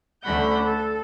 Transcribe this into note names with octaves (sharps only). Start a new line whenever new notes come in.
D2 A3 C#4 F#5 B5 G6
A4